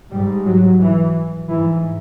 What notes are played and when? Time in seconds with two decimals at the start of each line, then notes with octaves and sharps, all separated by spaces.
0.11 G#2 G3
0.46 F#3
0.80 E3
1.49 G#2 E3